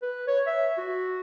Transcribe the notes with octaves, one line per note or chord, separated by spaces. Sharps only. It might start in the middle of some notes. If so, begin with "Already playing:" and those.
B4
C#5
E5
F#4